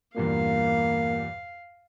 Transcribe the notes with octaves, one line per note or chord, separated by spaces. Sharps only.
E2 G2 A#2 A#3 F5